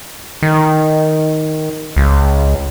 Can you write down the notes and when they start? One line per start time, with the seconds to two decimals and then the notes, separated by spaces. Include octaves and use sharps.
0.43 D#3
1.97 C#2